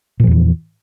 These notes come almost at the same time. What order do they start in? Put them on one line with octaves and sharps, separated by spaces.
A#2 F3 E2 E3